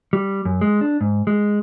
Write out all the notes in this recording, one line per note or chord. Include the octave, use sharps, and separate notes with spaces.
G3
F#2
G#3
D4
G#2
G#3